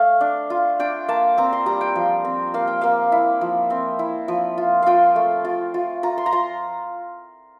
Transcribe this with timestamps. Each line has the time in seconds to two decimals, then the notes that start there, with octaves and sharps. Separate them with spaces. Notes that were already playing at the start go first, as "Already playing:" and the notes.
Already playing: A3 F5
0.21 D4
0.50 F4
0.79 D4 G5
1.08 A#3 A5
1.37 C4 A#5
1.53 C6
1.66 G3 A#5
1.81 G5
1.95 F3
2.25 C4
2.54 A#3 F5
2.67 G5
2.81 A#3 F5
3.12 E4
3.41 F3
3.70 C4
3.99 E4
4.28 F3
4.58 F4
4.82 F4 F5 G5
5.16 A3
5.45 F4
5.74 F4
6.03 F4 A#5
6.18 C6
6.26 A#5
6.32 F4 C6